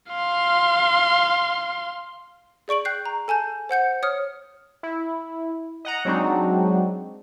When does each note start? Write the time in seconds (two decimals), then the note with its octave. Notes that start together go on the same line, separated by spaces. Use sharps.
0.12 F5 C6
2.68 G#4 D5 C#6 D7 F#7
2.85 G5 F#6 G6 C7
3.06 A#5
3.28 A4 G#5 A5 G6
3.69 C5 F#5 G6 C#7
4.03 C#5 D#6 F6 C#7
4.83 E4
5.85 D#5 F#5 A#5
6.05 F#3 G#3 C4 D4 D#4 F#4